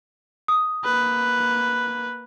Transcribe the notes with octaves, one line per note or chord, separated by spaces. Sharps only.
D#6
A#3 B4